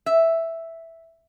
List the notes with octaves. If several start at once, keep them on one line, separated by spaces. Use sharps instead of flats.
E5